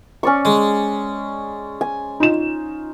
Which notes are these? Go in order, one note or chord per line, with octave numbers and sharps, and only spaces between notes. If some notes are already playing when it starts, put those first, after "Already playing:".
C#4 D5 C#6
G#3
G#5
D#4 F4 E7